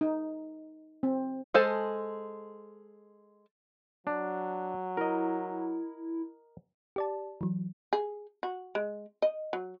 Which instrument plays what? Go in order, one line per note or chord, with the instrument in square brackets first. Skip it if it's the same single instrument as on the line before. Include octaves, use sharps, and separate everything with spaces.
[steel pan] D#4
C4
[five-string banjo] G#3 A4 C5 G#5 A5
[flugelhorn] F#3 [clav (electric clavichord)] D4
[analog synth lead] E4 [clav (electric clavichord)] A#4 D#5
[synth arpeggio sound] G4 D5 A5
E3 F#3
[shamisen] G#4
F#4
G#3
D#5
F#3